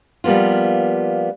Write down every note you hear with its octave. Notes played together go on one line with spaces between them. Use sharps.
F3 G3 A#3 B3 F4